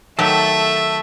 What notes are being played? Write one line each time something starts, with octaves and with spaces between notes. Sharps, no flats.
D#3 F#3 A3 G4 A4 E5